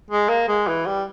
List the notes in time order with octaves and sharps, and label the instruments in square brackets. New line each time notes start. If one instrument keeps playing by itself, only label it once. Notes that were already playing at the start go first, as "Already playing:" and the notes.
[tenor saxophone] G#3
A#3
G#3
E3
G3